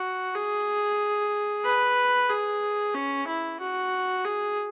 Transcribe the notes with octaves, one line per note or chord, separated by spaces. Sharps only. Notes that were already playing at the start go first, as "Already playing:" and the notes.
Already playing: F#4
G#4
B4
G#4
C#4
E4
F#4
G#4